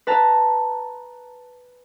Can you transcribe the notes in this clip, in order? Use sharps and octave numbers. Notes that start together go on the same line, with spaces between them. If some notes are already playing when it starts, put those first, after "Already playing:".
B4 A5 A#5